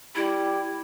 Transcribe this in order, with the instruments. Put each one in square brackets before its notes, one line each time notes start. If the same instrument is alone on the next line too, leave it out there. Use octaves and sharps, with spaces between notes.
[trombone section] G3 G4 [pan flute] E4